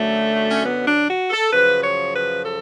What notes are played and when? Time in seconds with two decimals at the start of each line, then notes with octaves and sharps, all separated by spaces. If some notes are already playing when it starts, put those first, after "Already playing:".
Already playing: F#2 D3 F#3 A3
0.51 C#4
0.63 B3
0.86 D4
1.07 F#4
1.30 A4
1.53 F#2 C#3 F3 B4
1.83 C#5
2.13 B4
2.43 A4